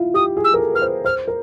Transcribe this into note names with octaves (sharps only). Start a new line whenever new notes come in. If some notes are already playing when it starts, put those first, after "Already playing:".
Already playing: E4 F4
G4 D#6
G#4
E6
A#4
A4
B4 F6
C5
C5 F6
A#4